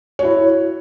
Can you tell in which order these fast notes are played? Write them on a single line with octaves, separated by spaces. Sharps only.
C#5 F#4 E4